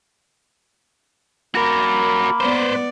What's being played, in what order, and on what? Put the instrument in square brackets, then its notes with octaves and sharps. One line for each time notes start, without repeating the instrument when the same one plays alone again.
[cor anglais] A#3 [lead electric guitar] F#4 A#4 [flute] B5
[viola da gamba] B3 D5 [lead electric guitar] B4 C5